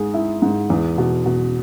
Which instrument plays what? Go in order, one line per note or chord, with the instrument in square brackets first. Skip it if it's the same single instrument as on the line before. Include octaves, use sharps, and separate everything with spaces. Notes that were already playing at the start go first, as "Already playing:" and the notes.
Already playing: [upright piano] G#2 G#4
E4
G#2
E2
B2
B2